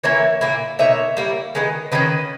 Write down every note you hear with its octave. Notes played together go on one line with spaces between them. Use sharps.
E3 A#3 E4 C#5 E5
A#2 A#3 E4
B2 A#3 D#4 C#5 E5
G3 A#3 E4
D#3 G#3 B3 D#4
D#3 A#3 C#4 B4 D#5